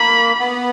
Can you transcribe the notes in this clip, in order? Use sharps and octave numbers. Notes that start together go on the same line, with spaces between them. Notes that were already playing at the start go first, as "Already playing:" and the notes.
Already playing: A#3 B5
B3